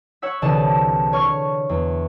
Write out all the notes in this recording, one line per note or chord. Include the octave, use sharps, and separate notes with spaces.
C#5 F#5 E6 B6
C2 D3 E3 G#4 A5
C#5 C#6 F6
E2